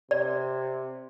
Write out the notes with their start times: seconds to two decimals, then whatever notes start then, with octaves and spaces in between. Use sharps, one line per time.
0.11 C3 D5